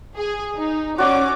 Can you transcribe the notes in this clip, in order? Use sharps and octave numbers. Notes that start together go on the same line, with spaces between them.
G#4
D#4
C#4 F#4 D5 D6